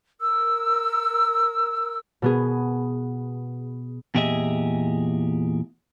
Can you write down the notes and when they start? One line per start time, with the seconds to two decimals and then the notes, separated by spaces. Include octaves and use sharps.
0.20 A#4 E6
2.22 B2 B3 G#4
4.15 E2 A#2 G4 G#4 D#5 E5